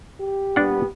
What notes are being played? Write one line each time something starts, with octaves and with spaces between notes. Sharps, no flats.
G4
A#2 G3 B3 D4 F#5